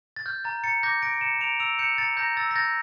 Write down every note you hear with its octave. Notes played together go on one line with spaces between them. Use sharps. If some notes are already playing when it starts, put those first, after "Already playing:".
A6
F6 G6
A#5 A6
A#5 A6 C#7
D6 G6 A#6
G6 A#6 D7
D7
A#5 C#7 E7
E7
A#5 D7 F7
E6 D7 F7
G6 C#7 E7
A#5 A6 C#7
A#5 G6 A#6
E6 A6
A#6
G6 A6